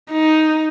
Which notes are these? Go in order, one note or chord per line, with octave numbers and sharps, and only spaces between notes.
D#4